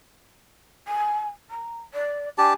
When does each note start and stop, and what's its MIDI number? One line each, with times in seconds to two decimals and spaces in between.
0.87 1.26 80
1.50 1.78 82
1.93 2.28 74
2.38 2.54 62
2.38 2.54 67
2.38 2.53 80
2.38 2.54 81